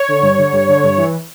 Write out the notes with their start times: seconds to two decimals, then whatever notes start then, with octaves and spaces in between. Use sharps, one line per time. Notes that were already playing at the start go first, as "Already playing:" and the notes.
Already playing: C#5
0.08 D3
0.22 G2
0.38 D3
0.52 G2
0.69 D3
0.83 G2
0.97 E3